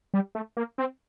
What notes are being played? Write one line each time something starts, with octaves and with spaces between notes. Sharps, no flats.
G3
A3
A#3
C4